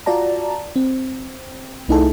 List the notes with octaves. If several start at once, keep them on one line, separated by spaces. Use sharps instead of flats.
F4 F#4 D5 A5 A#5
C4
C2 A3 D#4 E4 G#4 A4